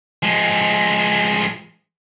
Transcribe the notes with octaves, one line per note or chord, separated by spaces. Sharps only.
F3 G#3